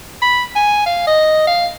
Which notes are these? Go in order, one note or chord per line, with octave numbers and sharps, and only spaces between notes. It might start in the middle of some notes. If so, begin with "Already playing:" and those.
B5
G#5
F5
D#5
F5